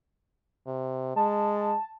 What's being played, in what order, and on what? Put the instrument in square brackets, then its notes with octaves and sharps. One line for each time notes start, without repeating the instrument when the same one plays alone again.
[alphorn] C3
[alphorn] G#3 [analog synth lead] A5